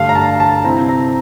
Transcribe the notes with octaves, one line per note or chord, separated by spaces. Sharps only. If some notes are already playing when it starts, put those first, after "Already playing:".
Already playing: G2 D3 A3 F5
A#5
A5
A5
C3 G3 C4 E4 A#5
A#5